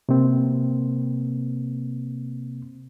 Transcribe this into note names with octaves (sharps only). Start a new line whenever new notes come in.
C3 A#3 C4